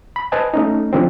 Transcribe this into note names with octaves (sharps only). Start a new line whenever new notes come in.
B5
B4 C5 D#5 G#5 A5
A3 C#4 D#4
D3 F3 C4